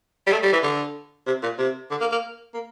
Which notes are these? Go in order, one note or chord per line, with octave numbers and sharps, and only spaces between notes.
G3
A3
G3
E3
D3
C3
A#2
C3
D3
A#3
A#3
A#3